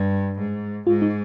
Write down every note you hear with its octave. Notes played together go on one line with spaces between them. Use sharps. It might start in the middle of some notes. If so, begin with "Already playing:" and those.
Already playing: G2
G#2
G#2 F4
D#4